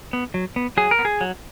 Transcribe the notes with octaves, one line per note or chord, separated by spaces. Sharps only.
B3
F#3
B3
F#3 G#4
A#4
B3
G#4
F#3